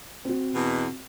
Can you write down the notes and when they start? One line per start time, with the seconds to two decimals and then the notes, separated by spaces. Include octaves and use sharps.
0.25 C4 F#4
0.54 E2 B2